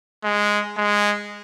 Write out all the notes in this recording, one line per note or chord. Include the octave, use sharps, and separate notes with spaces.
G#3
G#3